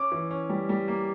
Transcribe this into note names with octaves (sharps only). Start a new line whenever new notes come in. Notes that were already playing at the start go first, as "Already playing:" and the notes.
Already playing: C#4 D6
E3
C#4
G3
G3
A#3